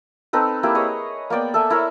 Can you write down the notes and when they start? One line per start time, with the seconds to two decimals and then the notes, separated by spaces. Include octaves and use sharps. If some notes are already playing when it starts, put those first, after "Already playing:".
0.33 C4 D#4 A4 B4
0.63 A#3 E4 G4
0.75 G#4 B4 C#5 D#5
1.30 A#3 B3 D5 G5
1.54 A4 E5 G#5
1.70 E4 A#4 C#5